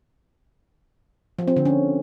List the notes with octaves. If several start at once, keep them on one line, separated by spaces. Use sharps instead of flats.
F3
C4
D3
C#4